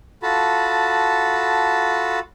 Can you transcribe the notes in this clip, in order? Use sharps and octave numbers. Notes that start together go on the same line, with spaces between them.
F4 F#4 A4 A5 B5